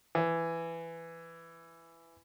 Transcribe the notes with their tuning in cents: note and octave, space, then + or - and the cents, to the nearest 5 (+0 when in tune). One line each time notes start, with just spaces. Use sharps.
E3 +15